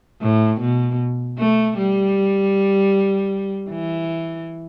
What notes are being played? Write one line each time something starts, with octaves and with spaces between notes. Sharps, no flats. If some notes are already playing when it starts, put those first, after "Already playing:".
A2
B2
A3
G3
E3